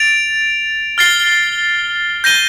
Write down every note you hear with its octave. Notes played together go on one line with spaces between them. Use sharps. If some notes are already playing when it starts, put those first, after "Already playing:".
Already playing: A6 D7 F7
F6 A6 C7 G7
G6 A#6 D#7 G7